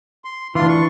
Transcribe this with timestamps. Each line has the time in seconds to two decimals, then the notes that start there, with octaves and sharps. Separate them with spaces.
0.25 C6
0.55 D2 E3 D4 F4 C6
0.69 C#6